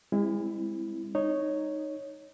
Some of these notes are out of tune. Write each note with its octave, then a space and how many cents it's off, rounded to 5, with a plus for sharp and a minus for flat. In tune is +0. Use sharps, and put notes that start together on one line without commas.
G#3 -40 C4 -10 E4 +0
D#4 -10 C#5 +0